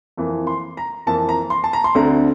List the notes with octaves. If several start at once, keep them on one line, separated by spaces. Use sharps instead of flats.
F2 E3 A#3
C6
A#5
F2 E3 A#3 A5
A#5
C6
A5
A#5
C6
D2 D3 A3 C4 A#5